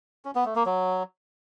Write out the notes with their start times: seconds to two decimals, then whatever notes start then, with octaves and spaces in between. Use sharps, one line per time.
0.25 C#4
0.35 B3
0.45 A3
0.56 A#3
0.66 F#3